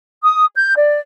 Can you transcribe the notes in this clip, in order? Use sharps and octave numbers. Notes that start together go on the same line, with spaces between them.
D#6
G6
D5